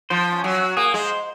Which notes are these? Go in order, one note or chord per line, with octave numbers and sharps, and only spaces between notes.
F3 C5
C#4
F#3
F#4
A#3 G#4
G#3 C5